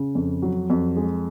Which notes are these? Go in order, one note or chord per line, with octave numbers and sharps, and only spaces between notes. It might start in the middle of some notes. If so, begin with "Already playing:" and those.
Already playing: C#3
F2
F#3
F2
G#3